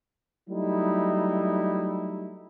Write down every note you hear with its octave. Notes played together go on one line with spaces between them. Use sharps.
F#3 G3 A3 D#4 E4